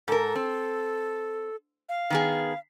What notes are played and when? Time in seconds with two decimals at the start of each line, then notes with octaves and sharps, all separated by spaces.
0.08 G#2 A4 A#4
0.35 C4
1.89 F5
2.10 D#3 B3 G#4